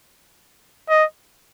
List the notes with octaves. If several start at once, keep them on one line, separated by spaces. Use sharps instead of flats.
D#5